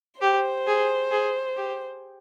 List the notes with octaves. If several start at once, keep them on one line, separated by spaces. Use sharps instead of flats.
G4 C5
G#4
G#4
G4